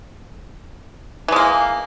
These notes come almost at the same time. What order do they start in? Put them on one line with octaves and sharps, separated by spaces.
E3 G#3 A#3